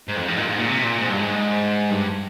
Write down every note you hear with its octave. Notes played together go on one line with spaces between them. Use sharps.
G#2
F2
G#2
A#2
G#2
A#2
C3
A#2
G#2
G2
G#2
G2